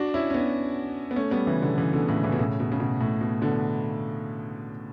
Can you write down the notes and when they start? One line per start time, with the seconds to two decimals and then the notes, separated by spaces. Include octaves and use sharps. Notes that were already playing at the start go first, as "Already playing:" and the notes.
Already playing: D4 F#4
0.14 C#4 E4
0.30 C#4
0.34 B3 D4
1.11 B3
1.16 A3 C#4
1.31 G3 B3
1.47 C#3 E3
1.62 B2 D3
1.77 C#3 E3
1.93 B2 D3
2.08 A2 C#3
2.24 C#3 E3
2.32 B2
2.39 A2 C#3
2.60 B2
2.72 C#3
2.80 B2
3.01 A2
3.21 B2
3.42 B2 D3